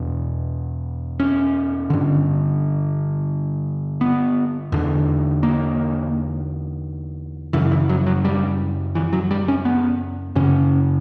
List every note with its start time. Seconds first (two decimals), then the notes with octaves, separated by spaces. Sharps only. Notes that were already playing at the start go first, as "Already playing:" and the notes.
Already playing: E2 B2
1.20 C#4
1.90 G2 D3
4.01 B3
4.72 E2 D3
5.43 A#3
7.53 F#2 C#3 E3
7.72 E3
7.89 F#3
8.06 F#3
8.25 G3
8.95 E3
9.13 F#3
9.31 G3
9.48 C#4
9.65 B3
10.35 F#2 C#3 C#4